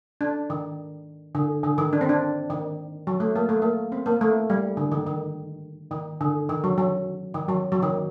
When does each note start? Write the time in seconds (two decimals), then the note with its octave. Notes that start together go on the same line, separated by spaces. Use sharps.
0.21 D4
0.50 D#3
1.35 D3
1.63 D3
1.78 D#3
1.93 D4
2.01 C4
2.09 D4
2.50 D#3
3.07 F#3
3.20 A3
3.36 A#3
3.49 A3
3.62 A#3
3.92 C4
4.06 A#3
4.21 A3
4.50 G3
4.77 D3
4.92 D#3
5.06 D#3
5.91 D#3
6.21 D3
6.49 D#3
6.64 F#3
6.78 F#3
7.34 D#3
7.49 F#3
7.72 F#3
7.82 D#3